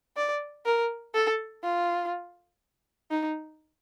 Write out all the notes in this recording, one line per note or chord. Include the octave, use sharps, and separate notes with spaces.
D5
A#4
A4
F4
D#4